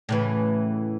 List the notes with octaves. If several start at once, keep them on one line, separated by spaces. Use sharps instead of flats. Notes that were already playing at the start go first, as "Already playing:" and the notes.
A2 C#3 E3